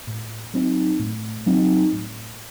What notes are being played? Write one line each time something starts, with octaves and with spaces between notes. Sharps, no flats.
A2
F#3 C4 D#4
A2
F#3 C4 D#4
A2